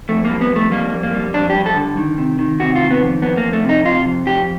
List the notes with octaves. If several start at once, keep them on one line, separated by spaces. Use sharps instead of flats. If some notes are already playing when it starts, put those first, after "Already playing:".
F2 A3
G3 A#3
B3
F2 A3
G3 A#3
F2
A#3
G3
F2 D4
G4
G3
A4
D3
D#3
C3
D#3
C3 F#4
F4
D#3
B3
F2
F2 B3
A#3
F2
A3
C3
D#4
C3 F4
F2
F2 G4